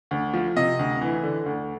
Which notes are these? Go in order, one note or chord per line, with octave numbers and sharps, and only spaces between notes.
D2
F3
C3 D#5
D2
E3
D3
D2